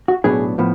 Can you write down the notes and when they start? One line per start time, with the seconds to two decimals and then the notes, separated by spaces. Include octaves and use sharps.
0.08 F#4
0.24 B1 A2 F#3 B3 D4 G#4
0.58 A2 F3 B3